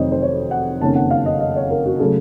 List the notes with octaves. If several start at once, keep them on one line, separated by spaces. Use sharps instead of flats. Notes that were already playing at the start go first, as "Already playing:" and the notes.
Already playing: F1 F2 D#3 F#3 C5 C#5 D#5
C5
C#5
F#5
F#1 F2 D#3 A#3 C#4 A5
F#5
F5
D#5
D#5
C#5
A#4
F#4
C#3 F#3 A3 A4